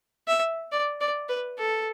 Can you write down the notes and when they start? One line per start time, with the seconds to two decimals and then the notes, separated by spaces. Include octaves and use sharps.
0.28 E5
0.72 D5
1.00 D5
1.29 B4
1.58 A4